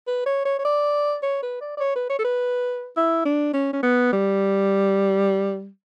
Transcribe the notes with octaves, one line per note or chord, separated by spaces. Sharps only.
B4
C#5
C#5
C#5
D5
C#5
B4
D5
D5
C#5
B4
C#5
A4
B4
E4
D4
C#4
C#4
B3
G3